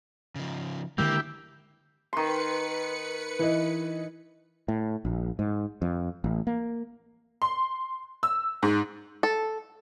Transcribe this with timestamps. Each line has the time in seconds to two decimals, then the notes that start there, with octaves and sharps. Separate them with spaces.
0.36 C#3 F3
0.98 D3 D#3 G#3 A#3 E4 G4
2.13 D#3 B4 C6 C#7
3.39 E3 D#5
4.68 A2
5.05 A#1
5.39 G#2
5.82 F2
6.24 A1
6.47 A#3
7.42 C6
8.23 E6
8.63 G#2
9.23 A4